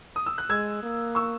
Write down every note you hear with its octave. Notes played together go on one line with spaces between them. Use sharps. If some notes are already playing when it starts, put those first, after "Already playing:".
D#6
E6
F#6
G#3 E6 G#6
A#3
C#6 E6